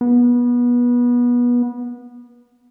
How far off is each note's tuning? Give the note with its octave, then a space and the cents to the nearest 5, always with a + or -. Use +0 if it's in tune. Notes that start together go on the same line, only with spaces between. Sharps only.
B3 -25